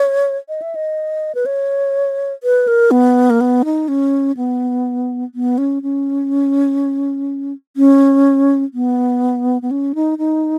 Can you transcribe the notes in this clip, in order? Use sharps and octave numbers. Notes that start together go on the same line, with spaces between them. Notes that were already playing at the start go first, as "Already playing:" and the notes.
Already playing: C#5
D#5
E5
D#5
B4
C#5
B4
A#4
B3
A#3
B3
D#4
C#4
B3
B3
C#4
C#4
C#4
B3
B3
C#4
D#4
D#4